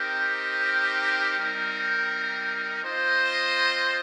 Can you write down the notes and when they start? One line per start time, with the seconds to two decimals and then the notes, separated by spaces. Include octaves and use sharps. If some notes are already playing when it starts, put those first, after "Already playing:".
Already playing: C4 D#4 G4 A#4
1.36 G3 C4 D#4 A#4
2.81 C4 F4 C5 D#5